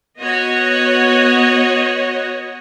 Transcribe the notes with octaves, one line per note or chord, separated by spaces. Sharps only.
B3 F#4 C#5 D#5